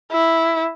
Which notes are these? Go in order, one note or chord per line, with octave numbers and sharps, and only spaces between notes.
E4